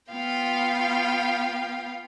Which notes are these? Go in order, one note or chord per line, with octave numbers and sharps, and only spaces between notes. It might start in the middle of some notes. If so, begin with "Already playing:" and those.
B3 F4 F5 G5